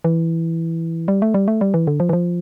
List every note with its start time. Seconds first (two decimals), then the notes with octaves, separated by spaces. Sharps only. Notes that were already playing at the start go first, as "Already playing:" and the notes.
0.04 E3
1.08 G3
1.22 A3
1.34 G3
1.48 A3
1.61 G3
1.74 E3
1.87 D3
2.00 F3
2.09 E3
2.13 F3